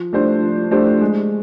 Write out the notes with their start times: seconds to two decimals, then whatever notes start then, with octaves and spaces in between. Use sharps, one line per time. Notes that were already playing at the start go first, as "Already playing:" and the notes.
Already playing: F3
0.13 A3 D4 G4 C5
0.42 F3
0.71 A3 D4 G4 C5
1.01 G#3